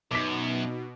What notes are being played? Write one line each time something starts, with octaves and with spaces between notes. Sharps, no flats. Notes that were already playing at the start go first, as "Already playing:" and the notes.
F#2 B2 D#4 D6 B6